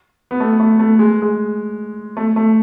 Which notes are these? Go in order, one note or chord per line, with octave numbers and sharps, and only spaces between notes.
B3
A3
A3
A3
G#3
G#3
A3
A3